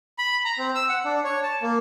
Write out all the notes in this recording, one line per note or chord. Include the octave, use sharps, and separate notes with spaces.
B5
A#5
C4
E6
F#5
D4
C#5
A5
A#3